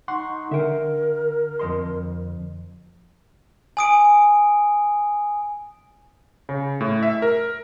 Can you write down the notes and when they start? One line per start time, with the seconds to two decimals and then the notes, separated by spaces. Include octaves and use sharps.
0.08 D#4 F#5 C6 C#6
0.51 D3 A#4 E5 G5
1.59 F2 D#5 C6
3.77 G#5 D#6 D7
6.49 C#3
6.81 A2
7.03 E5
7.22 A#4